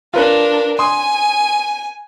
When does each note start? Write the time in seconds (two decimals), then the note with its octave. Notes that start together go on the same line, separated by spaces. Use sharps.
0.14 D4 F4 A#4 B4 F#6
0.79 G#5 C6 D#6